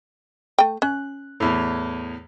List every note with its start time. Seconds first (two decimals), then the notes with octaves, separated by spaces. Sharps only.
0.59 A3 G5
0.82 C#4 F#6
1.40 E2 A2